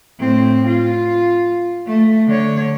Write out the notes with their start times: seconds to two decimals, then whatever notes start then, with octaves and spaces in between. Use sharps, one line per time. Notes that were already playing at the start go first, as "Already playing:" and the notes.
0.20 A2 C4
0.67 F4
1.87 A3
2.28 D3 C#5